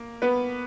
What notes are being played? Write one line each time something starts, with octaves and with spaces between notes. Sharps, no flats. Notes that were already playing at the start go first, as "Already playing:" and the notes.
Already playing: A#3
B3 B4